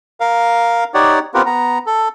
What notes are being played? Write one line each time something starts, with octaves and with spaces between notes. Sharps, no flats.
A#4 F5
D#4 G4 C#5 D5 F#5
B3 C4 F4 G4 A#4 B4
B3 A#5
A4